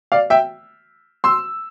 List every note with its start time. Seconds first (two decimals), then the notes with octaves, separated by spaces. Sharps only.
0.12 D5 F5
0.30 E5 G5
1.24 C6 E6